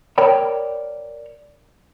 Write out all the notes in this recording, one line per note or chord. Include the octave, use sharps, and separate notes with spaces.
A#4 C#5 D5 G5 B5